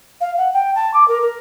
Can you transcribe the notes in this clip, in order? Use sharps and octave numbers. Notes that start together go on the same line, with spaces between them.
F5
F#5
G5
A5
D6
A#4
A#4